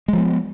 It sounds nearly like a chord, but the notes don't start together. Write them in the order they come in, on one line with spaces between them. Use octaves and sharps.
G#3 F3 B3